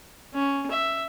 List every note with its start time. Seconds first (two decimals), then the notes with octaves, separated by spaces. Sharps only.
0.33 C#4
0.71 E5